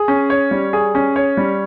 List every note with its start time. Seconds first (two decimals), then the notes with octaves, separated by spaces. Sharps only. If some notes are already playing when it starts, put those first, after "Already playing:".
Already playing: G#4
0.08 C#4
0.30 C#5
0.51 G3
0.73 G#4
0.95 C#4
1.16 C#5
1.37 G3